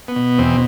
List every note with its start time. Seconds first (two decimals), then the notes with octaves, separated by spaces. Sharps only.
0.08 B3
0.16 B2
0.38 E2 C4